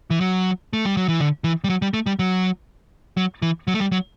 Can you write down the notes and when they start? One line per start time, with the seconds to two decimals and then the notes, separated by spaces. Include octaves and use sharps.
0.10 E3
0.21 F#3
0.73 A3
0.85 G3
0.97 F#3
1.08 E3
1.20 D3
1.44 E3
1.64 G3
1.69 F#3
1.82 G3
1.94 A3
2.06 G3
2.19 F#3
3.17 F#3
3.42 E3
3.67 F#3
3.74 A3
3.80 G3
3.92 F#3